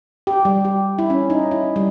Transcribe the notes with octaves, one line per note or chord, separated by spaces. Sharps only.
G4
G3
G4
E4
C#4
D#4
E4
G3